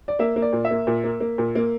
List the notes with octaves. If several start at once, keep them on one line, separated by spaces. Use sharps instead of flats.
D5
A#3 E5
A#3
D5
A#2
E5
A#3
A#2
A#3
A#3
A#2
A#3